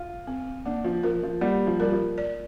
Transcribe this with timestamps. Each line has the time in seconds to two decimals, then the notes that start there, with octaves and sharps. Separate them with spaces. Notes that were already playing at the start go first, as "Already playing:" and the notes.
Already playing: F4
0.27 C4
0.65 A#3 D4
0.84 F3
1.03 F3 A#4
1.23 F3
1.41 G3 A#3
1.67 F3
1.80 G3 A#4
1.92 F3
2.18 D5